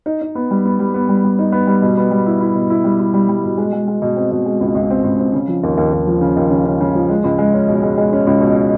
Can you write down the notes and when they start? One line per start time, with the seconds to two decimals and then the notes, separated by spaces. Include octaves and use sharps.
0.06 D#4
0.21 D#4
0.35 B3
0.51 G3
0.65 B3
0.79 G3
0.94 B3
1.09 G3
1.24 G3
1.39 D#4
1.52 B3
1.67 G3
1.82 B2
1.97 B3
2.11 G3
2.26 E4
2.41 E4
2.55 B2
2.70 E4
2.84 G3
3.00 E4
3.14 G3
3.29 G3
3.44 B2
3.58 G#3
3.73 G#3
3.88 G#3
4.02 B2
4.16 C4
4.31 B2
4.46 G#3
4.61 C#2
4.75 C#2
4.90 C4
5.04 C#2
5.20 C4
5.33 C#3
5.48 F3
5.63 D#2
5.77 D#2
5.93 D#2
6.07 F3
6.21 C#3
6.36 D#2
6.51 C#3
6.66 C#3
6.80 C#3
6.94 F3
7.09 G#3
7.24 C#2
7.38 G#3
7.54 C#4
7.68 B2
7.83 G#3
7.97 G#3
8.13 C#4
8.27 C#2
8.41 B2